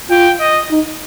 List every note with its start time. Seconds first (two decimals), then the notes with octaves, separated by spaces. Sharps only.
0.10 F4 G5
0.40 D#5
0.71 D#4